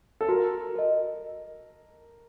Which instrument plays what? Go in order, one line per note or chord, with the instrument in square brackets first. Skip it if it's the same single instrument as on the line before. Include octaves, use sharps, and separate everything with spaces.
[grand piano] A4
[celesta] F#4 [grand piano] A#4
[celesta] A#4 D#5